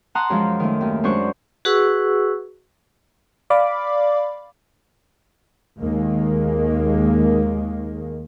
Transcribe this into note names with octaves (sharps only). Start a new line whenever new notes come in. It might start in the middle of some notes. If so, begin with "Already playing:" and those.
F#5 A5 A#5 C6 D#6 F#6
F#2 F3 G#3
D#3 A3
D#2
F#2 G#3 D4 C5 C#6 F#6
F#4 G#4 B4 F#5 C#6 E6
D5 F5 B5 D6
D#2 D#3 G#3 A#3